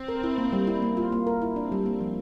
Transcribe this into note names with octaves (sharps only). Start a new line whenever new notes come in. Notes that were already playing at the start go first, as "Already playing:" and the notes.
Already playing: C4
A#4
E4
A#3
G3
E4
A#3
F4
A#3
A#4
E4
C4 D4
G3
A#3
F3